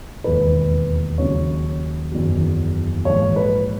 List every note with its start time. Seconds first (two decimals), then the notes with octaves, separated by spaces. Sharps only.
0.24 E1 D#2 D#3 B4
1.18 D#2 C#3 F#3 C#5
2.12 F#1 E2 D#3 F#3
3.05 A#1 G#2 E3 C#5
3.36 B4